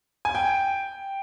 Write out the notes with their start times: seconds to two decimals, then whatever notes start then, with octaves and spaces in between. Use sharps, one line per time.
0.25 G#5
0.35 G5